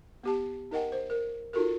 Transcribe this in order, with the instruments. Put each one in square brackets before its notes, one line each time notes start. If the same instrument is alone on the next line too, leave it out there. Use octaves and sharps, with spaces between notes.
[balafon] B3 G4 A5
D#4 A#4 D#5 F#5 G5
C5
A#4
D#4 F4 F#4 A4 A#4